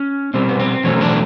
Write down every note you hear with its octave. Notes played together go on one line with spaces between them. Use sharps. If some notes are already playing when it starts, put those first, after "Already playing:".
Already playing: C#4
B2 G3 C4
B3
C4
E2 B2 F#3 A3 C#4
D4